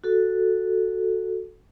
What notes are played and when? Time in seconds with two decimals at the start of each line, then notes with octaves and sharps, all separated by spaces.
0.04 F#4 A4